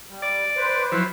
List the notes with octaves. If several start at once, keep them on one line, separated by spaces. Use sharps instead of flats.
G3
D5
B4 C5
F3 F#3 E4